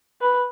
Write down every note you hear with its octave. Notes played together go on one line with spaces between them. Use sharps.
B4